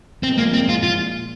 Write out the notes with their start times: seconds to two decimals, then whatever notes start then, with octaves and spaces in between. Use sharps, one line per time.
0.23 A#2 F3 G#3 C4
0.38 A#3
0.54 C4
0.69 F4
0.83 F4